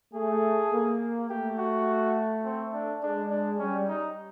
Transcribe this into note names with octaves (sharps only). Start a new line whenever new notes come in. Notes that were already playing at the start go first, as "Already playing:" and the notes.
A3 G#4
A#3
A3 G4
F#4
C4
D4
G#3 D4
D4
G3 C#4
D#4